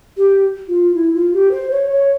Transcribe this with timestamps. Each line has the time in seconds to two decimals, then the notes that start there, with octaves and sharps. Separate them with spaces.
0.17 G4
0.68 F4
0.94 E4
1.14 F4
1.33 G4
1.51 C5
1.71 C#5
1.91 C#5